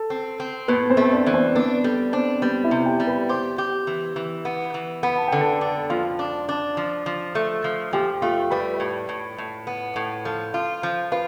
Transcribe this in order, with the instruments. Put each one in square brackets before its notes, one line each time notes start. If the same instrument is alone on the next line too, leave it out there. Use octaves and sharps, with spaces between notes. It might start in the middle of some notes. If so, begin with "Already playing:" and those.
Already playing: [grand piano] A4
[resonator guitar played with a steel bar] C4
C4
[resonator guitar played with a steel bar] A2 [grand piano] B3 B4
[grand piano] C4 C5
[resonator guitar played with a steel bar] A3
[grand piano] D4 D5
[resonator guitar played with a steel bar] E3
[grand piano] C4 C5
[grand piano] B3 B4 [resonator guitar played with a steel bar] D4
[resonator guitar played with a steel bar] G3 [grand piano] A4
[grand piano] C4 C5 [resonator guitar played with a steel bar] D4
[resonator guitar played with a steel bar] G3 [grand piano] B3 B4
[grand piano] E4 E5
[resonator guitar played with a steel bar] C3
[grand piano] G4 G5
[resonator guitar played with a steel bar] G3
[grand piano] B4 B5
[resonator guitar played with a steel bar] G4 [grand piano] C5 C6
[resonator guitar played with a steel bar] G4
E3
E3
B3
E3
[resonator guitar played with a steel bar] B3 [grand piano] B5
[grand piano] A5
[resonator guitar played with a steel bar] D3 [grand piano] G5
[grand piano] A4 A5
[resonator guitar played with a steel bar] D4
[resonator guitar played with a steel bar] F3 [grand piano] F4 F5
[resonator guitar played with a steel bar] D4
D4
F3
F3
A3
F3
[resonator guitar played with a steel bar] F3 [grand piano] G4 G5
[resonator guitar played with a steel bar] A3 [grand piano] F4 F5
[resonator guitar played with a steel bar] G3 [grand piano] B4 B5
[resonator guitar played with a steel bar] A2
A2
A2
B3
A2
[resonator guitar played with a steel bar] F3 [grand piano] A4 A5
[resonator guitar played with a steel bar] F4
F3
[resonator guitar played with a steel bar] F4 [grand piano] B4 B5